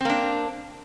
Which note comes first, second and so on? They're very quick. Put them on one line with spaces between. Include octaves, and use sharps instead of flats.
C4 A#3 D4